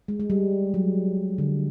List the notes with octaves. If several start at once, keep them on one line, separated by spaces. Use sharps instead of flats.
G#3
G#3
G3
F#3
D3